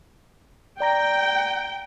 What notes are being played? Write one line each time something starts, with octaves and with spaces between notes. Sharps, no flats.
D5 G5 A#5 A#6